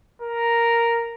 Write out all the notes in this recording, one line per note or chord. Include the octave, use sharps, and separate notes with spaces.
A#4